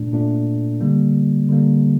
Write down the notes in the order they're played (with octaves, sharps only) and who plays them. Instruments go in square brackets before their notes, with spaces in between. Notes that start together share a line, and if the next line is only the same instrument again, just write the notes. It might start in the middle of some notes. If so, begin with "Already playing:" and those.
Already playing: [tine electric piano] A#2 A3 D4
A#2 A3 D4
D3 G3 A#3
D3 G3 A#3